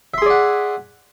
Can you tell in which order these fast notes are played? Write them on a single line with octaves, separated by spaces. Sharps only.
E5 C6 G#4 D5 F#5